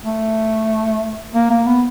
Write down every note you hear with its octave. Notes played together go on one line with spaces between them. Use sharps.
A3
A#3
A#3
B3